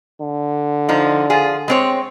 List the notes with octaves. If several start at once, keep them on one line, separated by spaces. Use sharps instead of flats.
D3
F3 D#4
F3 F4 G#4
G#3 C4 C#5